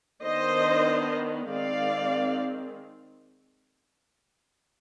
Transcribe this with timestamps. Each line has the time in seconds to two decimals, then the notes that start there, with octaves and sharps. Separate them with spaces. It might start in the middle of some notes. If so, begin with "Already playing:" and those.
0.22 D#3 B3 D4 C5 D#5
1.49 D#3 G#3 C4 D5 F5